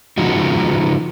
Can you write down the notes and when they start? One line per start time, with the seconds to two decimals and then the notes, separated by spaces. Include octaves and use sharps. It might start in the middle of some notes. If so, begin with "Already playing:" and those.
0.18 C#3 F3 G#3 D#4 F#4